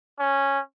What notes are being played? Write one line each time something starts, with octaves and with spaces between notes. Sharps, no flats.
C#4